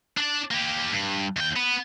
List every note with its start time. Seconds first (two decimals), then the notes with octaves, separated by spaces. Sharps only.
0.17 D4 D5
0.51 A#3 G4
0.92 G2
1.37 D#2 G5
1.56 B3